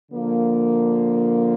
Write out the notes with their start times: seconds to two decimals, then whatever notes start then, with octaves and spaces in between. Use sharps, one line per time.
0.10 D3 F3 A#3